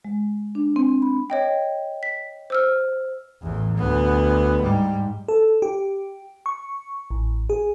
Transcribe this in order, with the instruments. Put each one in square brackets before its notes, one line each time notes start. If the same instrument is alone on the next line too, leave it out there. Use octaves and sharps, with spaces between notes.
[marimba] G#3
D4
C4
B5
[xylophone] C#5 D#5 G5
B6
C5 E6 F6
[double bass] A1 E2
D2 B3
G#2 G3
[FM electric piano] A4
G4
C#6
A1
G#4